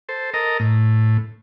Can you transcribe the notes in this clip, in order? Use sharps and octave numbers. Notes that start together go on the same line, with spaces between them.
A4 C5
A4 A#4 D#5 A#5
A2